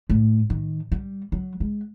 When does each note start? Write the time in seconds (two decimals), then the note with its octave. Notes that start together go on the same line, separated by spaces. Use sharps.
0.10 A2
0.50 D#3
0.92 G3
1.32 F#3
1.60 G#3